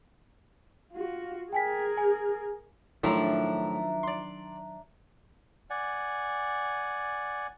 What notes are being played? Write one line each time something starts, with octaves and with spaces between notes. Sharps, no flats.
F4 F#4
G#4 A#4 G5 G#5 B6
G#5
A2 D#3 F3 F#3 D4 E4 E5 A#5
D5 C6
D5 F#5 G#5